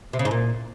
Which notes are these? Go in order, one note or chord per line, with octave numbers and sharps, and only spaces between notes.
C3
C#3
G#2
A#2